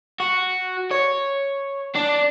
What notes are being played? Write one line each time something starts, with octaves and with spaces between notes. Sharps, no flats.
F#4
C#5
D4